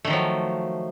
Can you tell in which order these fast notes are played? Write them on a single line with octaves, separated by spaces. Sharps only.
A3 D#3 F3 F#3